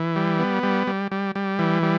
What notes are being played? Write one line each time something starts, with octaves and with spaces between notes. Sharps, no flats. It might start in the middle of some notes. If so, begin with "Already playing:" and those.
Already playing: E3
G3
B3
G3
G3
G3
G3
E3
G3